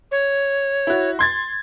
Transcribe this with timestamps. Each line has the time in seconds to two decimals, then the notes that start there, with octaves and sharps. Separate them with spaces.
0.11 C#5
0.87 E4 F#4
1.19 C6 G#6 A6